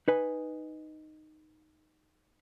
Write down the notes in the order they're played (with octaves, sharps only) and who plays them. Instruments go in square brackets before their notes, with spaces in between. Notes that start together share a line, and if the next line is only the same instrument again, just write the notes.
[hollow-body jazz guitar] D#4 B4 G#5